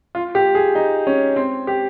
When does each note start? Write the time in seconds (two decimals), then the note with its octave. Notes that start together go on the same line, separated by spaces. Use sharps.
0.15 F4
0.35 G4
0.55 G#4
0.75 D#4
1.07 C#4
1.36 C4
1.67 G4